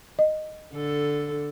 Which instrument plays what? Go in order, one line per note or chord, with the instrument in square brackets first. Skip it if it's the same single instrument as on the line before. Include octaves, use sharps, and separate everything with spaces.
[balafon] D#5
[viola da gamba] D3 A4